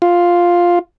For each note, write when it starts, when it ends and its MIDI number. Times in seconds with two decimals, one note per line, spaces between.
0.02 0.79 65